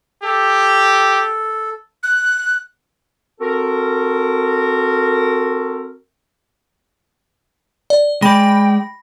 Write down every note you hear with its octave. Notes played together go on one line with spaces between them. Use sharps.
G4 A4
F#6
C4 F#4 A4 A#4
D5
G#3 D5 G5 B5 A#6